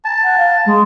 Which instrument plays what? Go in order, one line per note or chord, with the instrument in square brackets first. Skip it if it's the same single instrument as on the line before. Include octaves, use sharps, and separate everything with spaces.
[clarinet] A5
[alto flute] F#5
F5
G#3